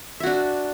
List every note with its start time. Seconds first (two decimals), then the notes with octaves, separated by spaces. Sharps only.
0.20 E5
0.23 F#4
0.26 D4